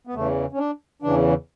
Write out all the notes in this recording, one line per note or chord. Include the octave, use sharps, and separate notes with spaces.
B3
E2 C#3 E3 A3
C#4
D4
E2 C#3 E3 D4